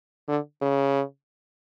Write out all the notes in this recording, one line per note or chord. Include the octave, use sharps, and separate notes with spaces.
D3
C#3